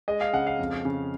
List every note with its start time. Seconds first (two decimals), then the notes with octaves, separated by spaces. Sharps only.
0.08 G#3 D#5
0.21 F5
0.33 C#3 F#5
0.47 F5
0.59 F2
0.85 C#3